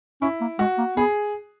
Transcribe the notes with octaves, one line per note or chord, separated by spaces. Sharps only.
C#4 E4
A#3
G#3 F#4
A#3
B3 G#4